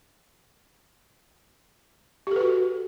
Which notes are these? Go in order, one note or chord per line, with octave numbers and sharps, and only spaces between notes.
F#4 G4 A4 B4